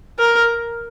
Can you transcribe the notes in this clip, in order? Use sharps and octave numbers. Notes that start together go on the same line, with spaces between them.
A#4